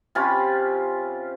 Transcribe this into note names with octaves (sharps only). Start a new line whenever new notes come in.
C3 C#4 F4 B5